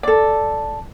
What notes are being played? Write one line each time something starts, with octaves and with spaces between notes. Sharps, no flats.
A4 D5